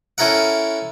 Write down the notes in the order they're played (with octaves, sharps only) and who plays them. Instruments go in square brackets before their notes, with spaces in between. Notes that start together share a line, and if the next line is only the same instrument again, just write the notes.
[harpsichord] C#4 E4 A4 A#4 F#5